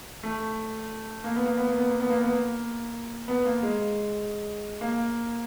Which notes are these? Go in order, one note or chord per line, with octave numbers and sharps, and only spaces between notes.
A3
A#3
B3
A#3
B3
A#3
B3
A#3
B3
A#3
B3
A#3
B3
A#3
G#3
A#3